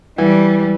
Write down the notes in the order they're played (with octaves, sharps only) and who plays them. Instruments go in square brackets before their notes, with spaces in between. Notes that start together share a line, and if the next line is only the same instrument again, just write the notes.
[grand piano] E3 [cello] G3